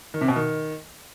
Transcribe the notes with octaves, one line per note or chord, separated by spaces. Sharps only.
D#3
C3
B2
D#3